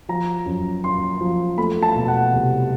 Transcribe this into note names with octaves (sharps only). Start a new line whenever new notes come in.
F3 A#5
F#2
F#2 C6
F3
A3 B5
A5
B2
F#5
C2